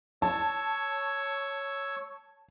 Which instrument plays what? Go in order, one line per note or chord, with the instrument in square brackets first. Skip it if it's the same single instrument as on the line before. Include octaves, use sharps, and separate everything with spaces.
[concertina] C#5 C#6 E6 [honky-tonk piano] A5